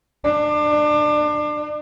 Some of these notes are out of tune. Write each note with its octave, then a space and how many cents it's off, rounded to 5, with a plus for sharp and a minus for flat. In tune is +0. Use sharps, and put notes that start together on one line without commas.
D4 +30